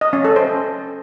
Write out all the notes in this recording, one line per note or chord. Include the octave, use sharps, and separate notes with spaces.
D#5
C#4
A4
C5